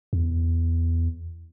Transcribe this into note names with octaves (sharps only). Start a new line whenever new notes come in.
E2